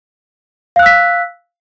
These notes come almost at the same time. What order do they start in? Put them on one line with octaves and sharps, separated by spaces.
F5 F#6 E6 B6